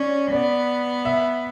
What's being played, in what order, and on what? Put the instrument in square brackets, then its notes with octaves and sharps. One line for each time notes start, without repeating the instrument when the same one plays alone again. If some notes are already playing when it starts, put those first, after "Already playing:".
Already playing: [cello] C#4 [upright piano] D5
[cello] B3 [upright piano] D5
[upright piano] E5